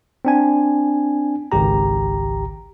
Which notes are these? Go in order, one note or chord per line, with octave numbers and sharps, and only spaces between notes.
C4 D4 G#5
G#1 C#2 G4 A#5